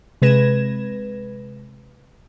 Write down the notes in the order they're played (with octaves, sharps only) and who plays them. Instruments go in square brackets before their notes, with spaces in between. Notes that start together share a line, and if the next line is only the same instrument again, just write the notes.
[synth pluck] C3 G#3 B4 G#6 A#6 E7